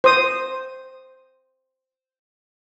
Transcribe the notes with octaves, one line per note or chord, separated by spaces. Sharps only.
C5 D#6